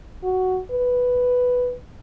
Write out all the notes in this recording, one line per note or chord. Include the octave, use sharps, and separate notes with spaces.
F#4
B4